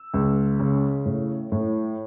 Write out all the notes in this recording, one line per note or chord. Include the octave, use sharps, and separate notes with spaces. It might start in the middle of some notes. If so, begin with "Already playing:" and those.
Already playing: E6
C#2
C#3
A2
A2